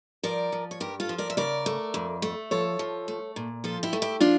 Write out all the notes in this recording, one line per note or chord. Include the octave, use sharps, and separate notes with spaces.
F3 A#4 D5
F3
C#5
G2 G4 A#4
F4 A4
F3
A#4 D5
E5
C#3 A#4 D5
A3
F2
A3
F3 A4 C#5
F3
A3
A#2
F3 F4 A4
E4 G4
A3
E4 G4
F3 D4 F4